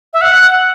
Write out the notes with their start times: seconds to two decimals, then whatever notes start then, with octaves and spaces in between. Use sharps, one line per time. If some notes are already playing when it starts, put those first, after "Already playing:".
0.13 E5
0.21 F#5